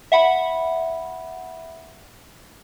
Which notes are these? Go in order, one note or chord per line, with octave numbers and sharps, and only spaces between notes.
E5 F#5 B5